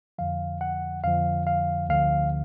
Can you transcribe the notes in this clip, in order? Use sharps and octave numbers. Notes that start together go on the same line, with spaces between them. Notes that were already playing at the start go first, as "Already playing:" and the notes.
F2 D3 F3 F5
F#5
F2 D3 F3 F5
F5
D2 D3 F3 F5